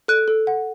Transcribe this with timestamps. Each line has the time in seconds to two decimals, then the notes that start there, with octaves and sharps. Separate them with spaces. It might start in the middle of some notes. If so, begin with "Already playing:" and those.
0.08 A4 F#6
0.28 A4
0.47 F#5